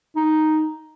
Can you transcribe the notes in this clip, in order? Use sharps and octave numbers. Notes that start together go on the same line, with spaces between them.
D#4